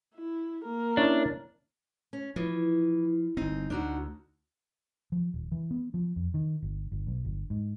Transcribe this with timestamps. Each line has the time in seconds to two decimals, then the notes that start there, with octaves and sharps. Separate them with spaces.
0.15 E4
0.64 A#3 A#4
0.97 C#4 D4 E4
2.13 C#4
2.36 E3 F3
3.37 G1 C4 D#4
3.70 D2 D4 D#4 F#4
5.12 F3
5.34 D#1
5.52 E3
5.71 B3
5.94 F3
6.16 F2
6.34 D#3
6.62 G1
6.92 G1
7.07 B1
7.25 G1
7.50 G#2